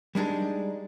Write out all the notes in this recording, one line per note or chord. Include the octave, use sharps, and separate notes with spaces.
G3 G#3 D4 D#4